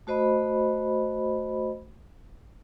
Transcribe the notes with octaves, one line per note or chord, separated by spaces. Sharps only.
A3 F#4 C5 D#5 B5